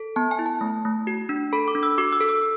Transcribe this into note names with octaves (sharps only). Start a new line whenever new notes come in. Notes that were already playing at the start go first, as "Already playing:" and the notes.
Already playing: A4
B3 A5
G#5
E4
A5
A3
A3
F#4
D4
A4 B5
D6
D4
E6
F#4 D6
E6
A4
E6